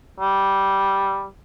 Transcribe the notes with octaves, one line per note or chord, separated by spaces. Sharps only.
G3